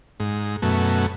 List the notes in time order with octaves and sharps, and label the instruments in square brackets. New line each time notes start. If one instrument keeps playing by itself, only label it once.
[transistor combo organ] G#2
F#2 B2 A3